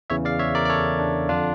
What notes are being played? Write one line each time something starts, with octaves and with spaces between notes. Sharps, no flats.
E2 C#3 E3 C#5 E5
D5 F5
C#5 E5
A#4 D5
D5
A4 C#5
D4
F2 D3 D4 F4